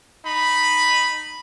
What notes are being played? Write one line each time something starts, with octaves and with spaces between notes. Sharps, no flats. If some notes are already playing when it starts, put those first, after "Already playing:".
D#4 B5